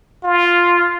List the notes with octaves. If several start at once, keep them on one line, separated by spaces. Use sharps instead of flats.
F4